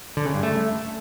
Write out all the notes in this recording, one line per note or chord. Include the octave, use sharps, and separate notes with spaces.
D3
C#3
G2
A3